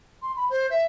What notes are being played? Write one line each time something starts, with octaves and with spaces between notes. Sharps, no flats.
C6
B5
C5
E5